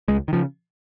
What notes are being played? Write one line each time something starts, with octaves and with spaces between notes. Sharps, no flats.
C#2 G#3
D#3
C#3 F3